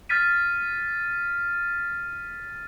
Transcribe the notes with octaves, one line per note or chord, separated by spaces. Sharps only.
F6 A6 B6 D#7